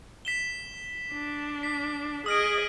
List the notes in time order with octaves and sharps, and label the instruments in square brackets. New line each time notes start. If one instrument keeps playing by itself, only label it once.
[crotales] B6 E7 G7
[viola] D4
[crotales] B6
[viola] G#4 D#5 [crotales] D#6 F6 D7